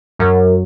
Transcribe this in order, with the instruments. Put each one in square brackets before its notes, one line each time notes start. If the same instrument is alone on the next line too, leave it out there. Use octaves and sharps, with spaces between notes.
[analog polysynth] F#2